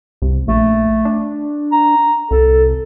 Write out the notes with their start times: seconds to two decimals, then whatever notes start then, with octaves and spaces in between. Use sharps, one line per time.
0.22 C2
0.48 A#1 A3
1.05 D4
1.72 A#5
2.31 C2 A4